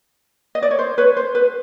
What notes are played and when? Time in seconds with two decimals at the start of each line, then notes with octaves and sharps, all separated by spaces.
0.55 D#5
0.63 D5
0.71 C#5
0.79 C5
0.98 B4 C#5
1.17 C5
1.35 B4